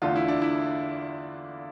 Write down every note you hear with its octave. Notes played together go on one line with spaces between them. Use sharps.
E2 D3 A3 F4
E4
D4
E4